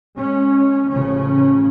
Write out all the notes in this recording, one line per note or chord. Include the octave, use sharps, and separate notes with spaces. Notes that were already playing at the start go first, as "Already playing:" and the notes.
G#3 C#4
A1 C#3 F3 C#4